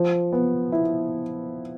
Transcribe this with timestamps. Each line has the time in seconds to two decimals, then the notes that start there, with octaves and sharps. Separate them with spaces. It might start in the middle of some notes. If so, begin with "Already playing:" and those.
Already playing: F3
0.32 B3
0.72 E4